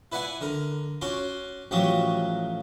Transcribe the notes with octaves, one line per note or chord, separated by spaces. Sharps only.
E4 B4 D5 F#5 G#5
D3 A#4
C#4 F#4 C6 D6
A1 F3 F#3 F#4 G4 D#6